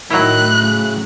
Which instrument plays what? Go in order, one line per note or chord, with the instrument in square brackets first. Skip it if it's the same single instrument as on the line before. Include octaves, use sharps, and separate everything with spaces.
[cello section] A2 [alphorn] D#3 [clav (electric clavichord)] F#3 E4 [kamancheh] F#6
[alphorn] C#3